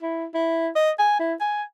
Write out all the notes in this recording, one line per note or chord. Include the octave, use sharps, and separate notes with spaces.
E4
E4
D#5
G#5
E4
G#5